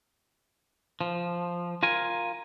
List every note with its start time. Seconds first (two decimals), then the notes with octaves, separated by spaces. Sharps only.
1.01 F3
1.83 F4 A#4 G#5